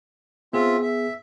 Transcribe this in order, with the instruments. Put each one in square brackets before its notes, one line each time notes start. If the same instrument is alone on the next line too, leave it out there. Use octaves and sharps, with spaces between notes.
[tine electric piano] B3 G#4 [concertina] C4 F4 E5
[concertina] E5